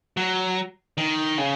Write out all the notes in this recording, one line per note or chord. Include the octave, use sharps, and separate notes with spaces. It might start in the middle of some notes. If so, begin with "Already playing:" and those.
F#3
D#3
C#3